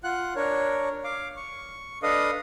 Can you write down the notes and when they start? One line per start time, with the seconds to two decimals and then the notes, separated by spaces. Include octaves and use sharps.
0.04 F4 F#5 F#6
0.36 D4 A#4 C#5
1.04 F5 D6
1.37 C#6
2.03 D4 A4 B4 D#5 F5 D#6